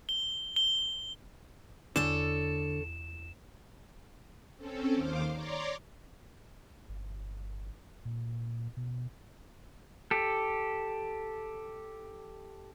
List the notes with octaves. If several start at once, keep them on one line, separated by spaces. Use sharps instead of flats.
G7
G7
E2 D3 A4 C#5 E7
C4 C#4 A4
D#2 D#3 C5 F5 D6
C#5 D5 A#5 C6 D6
G1
A#2
B2
G4 A4